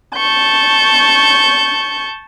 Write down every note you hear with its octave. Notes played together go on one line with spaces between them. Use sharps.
A5 C#6 G6